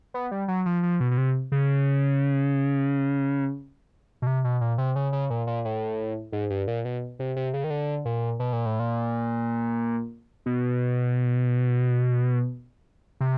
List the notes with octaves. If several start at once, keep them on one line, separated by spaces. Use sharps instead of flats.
B3
G3
F#3
F3
F3
B2
B2
C3
C#3
B2
C3
B2
A#2
C3
C#3
C#3
A#2
A#2
A2
G#2
G2
A#2
B2
C3
C3
C#3
D#3
D3
A#2
B2
A#2
A2
A#2
B2
C3